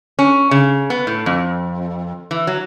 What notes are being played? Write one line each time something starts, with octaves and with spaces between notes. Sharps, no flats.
C#4
C#3
B3
A2
F2
E3
F#3